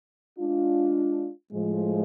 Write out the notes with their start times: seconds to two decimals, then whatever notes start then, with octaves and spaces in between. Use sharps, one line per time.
0.37 G#3 D4 F4
1.51 A2 F3 G#3